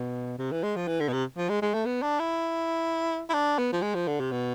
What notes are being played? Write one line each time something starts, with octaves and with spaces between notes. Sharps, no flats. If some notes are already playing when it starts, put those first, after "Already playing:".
Already playing: B2
C3
E3
G#3
F3
E3
D3
B2
C3
F3
G#3
G#3
A3
B3
D4
E4
E4
D4
B3
F3
G#3
F3
D3
C3
B2